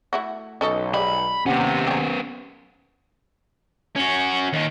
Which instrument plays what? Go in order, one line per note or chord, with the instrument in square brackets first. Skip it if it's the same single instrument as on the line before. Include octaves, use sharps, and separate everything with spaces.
[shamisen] A3 E4 F#4
[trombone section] B1 [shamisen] C#4 A4 D#5
[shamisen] G3 G#3 [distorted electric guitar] B5
[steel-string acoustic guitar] D#2 F#5 [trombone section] C3 [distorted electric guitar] B3 C#4
[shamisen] G4 G#4
[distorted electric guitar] C#4 F#4
D#2 D#3